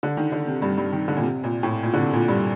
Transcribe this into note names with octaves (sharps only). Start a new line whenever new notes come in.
D3
D#3
D3
C3
G2
G2
D#3
D3
A#2
C3
A#2
A2
A#2
D3
C3
A#2
G2